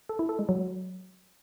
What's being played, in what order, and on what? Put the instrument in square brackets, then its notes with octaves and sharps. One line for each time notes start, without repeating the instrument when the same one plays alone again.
[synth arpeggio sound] A4
E4
A4
G#3
F#3